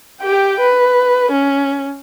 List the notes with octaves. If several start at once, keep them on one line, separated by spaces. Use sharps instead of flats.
G4 G5
B4
C#4